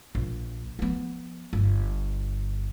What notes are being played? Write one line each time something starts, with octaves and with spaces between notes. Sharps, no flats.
A#1
F3 B3
G1